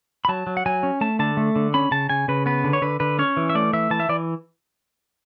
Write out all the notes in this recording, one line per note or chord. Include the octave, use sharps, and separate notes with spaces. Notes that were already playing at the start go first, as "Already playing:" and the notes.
B5
F#3 A5
F#3
F#5
F#3 G#5
C#4
A3 A5
D3 A5
A3
D3
C#4 B5
C#3 A5
C#3 G#5
C#3 B4
B3 B4
D3
C#5
D3 B4
D3 B4
C#4 C#5
E3
E5
A3 D5
E3 E5
E3 A5
E5
E3 D5